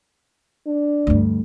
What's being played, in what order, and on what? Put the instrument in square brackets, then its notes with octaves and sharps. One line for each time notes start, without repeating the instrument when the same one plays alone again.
[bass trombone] D4
[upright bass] D2 G2